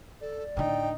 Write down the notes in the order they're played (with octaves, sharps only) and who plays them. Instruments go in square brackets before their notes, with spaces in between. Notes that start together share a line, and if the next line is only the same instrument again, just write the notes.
[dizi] A4 [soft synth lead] D5
[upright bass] A2 D3 [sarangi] D#4 [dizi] G5